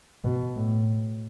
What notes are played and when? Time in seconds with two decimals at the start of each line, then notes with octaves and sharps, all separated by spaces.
0.24 B2
0.56 A2